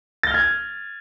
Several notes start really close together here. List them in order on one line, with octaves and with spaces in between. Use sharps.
A6 G7 F6 G#6